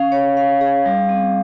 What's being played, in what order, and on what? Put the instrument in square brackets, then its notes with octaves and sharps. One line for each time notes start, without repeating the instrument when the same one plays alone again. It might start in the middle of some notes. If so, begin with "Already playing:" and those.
Already playing: [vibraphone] C#4 F5
C#5
F5
G#4
G3
C4